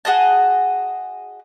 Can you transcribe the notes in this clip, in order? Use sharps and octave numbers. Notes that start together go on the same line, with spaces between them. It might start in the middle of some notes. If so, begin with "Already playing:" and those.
F#4 G#4 D#5 A5